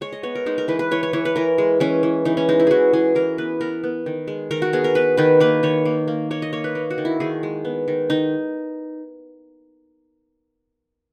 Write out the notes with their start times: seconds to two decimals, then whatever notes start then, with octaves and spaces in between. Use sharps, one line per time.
0.01 G#3 C#5
0.13 D#5
0.23 B3 C#5
0.35 A#4
0.46 G#3 D#4
0.58 A#4
0.68 E3 B4
0.79 B4
0.91 E3 C#5
1.03 C#5
1.13 E3 C#5
1.25 B4
1.36 E3 A#4
1.58 G#3
1.80 E3 C#4
2.03 E3
2.25 E3 D#4
2.37 C#4
2.49 G#3 D#4
2.60 E4
2.67 E3 F#4 G#4
2.93 E3 G#4
3.15 E3 A#4
3.38 B3 B4
3.61 B3 A#4
3.84 B3
4.06 D#3
4.28 G#3
4.51 D#3 A#4
4.62 F#4
4.73 B3 G#4
4.84 A#4
4.95 B3 B4
5.17 D#3 B4
5.40 A#3 B4
5.63 D#3 C#5
5.85 A#3
6.08 A#3
6.31 A#3 C#5
6.42 D#5
6.53 A#3 C#5
6.64 B4
6.75 A#3
6.91 F#4
6.98 D#3
7.05 E4
7.20 D#3 G#4
7.43 G#3
7.65 B3
7.88 D#3
8.10 D#3 D#4